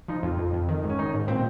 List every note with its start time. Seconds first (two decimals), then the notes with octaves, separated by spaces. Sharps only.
0.08 F3 D#4
0.23 F2 F4
0.39 F2
0.54 F2
0.69 D#3
0.84 G#2
0.90 C#4
0.99 D#3 D#4
1.14 G#2
1.28 A#2 C4